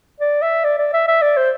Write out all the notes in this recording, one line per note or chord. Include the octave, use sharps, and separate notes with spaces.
D5
E5
D5
D5
E5
E5
D5
C5